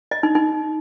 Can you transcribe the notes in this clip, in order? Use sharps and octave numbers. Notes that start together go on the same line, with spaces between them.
D#5
D#4
D#4